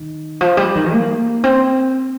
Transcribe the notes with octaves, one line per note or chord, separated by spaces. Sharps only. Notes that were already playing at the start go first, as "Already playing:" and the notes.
Already playing: D#3
F3
G3
D#3
A#3
C4